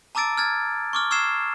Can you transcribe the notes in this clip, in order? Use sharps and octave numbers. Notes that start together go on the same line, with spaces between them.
A5 A#5 D6 E6 A6 D7
F6 G#6 A6
C#6 D6 F6
C#6 E6 F6 G#6 C7 E7